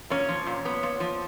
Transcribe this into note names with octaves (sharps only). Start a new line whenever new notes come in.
A#2 C#4 C#5
F3
A#2
B3
A#2
F3